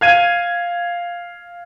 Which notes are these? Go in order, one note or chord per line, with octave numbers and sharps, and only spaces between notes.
F5 G#6 D#7